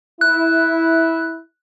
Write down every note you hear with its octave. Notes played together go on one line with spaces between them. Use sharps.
E4 F#6